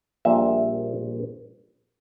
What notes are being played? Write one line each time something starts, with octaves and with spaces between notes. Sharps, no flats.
A#1 A#2 G3 E5